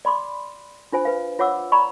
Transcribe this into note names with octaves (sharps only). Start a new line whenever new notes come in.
D5 B5 C6 D6
D4 F4 C5 G#5
B4 F5
F4 C#5 F#5 D6 E6
D5 A#5 B5 C#6